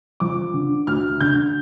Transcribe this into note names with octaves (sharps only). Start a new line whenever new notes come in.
F3 D6
D3
D2 F6
D3 G6